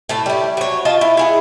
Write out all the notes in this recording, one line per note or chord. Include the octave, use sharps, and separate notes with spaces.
A2 A3 A5
G3 E4
F#3 C#5
F4 D#5 A5
E4
E4 G#4 F#5